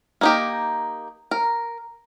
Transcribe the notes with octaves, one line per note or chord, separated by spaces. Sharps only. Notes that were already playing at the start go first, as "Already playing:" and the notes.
A#3 D#4 G4
A#4